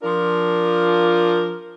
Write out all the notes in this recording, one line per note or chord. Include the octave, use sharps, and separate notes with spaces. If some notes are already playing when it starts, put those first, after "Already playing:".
F3 D4 F4 A#4